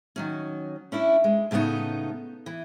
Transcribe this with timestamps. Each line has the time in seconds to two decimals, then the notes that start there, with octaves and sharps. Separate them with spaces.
0.16 D#3 F#3 C#4
0.92 C#4 D4 E4
1.24 G#3
1.51 A2 C#3 A3 B3 D#4
2.46 E3